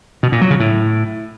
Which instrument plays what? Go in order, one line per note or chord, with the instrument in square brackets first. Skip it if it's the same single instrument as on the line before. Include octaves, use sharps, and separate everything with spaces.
[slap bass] B2
A#2
F#3
C#3
A2